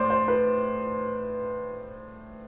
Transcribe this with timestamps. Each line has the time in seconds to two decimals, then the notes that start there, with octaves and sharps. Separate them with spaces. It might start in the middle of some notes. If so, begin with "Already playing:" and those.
Already playing: A2 C5 D5
0.10 C5
0.28 B4